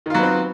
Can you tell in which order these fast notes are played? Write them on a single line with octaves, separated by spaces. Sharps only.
D#3 F4 F#3 B3 C4